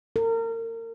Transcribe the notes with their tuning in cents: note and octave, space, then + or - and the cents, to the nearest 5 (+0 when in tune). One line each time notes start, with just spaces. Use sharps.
A#4 -35